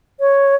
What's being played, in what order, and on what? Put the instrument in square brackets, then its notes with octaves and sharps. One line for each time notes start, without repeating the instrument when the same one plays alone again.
[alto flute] C#5